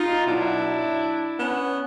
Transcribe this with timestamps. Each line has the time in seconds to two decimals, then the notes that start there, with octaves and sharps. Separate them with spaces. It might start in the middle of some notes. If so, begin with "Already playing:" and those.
Already playing: D#4 F4
0.26 B2 F#3 D4 E4
1.39 B3 C#4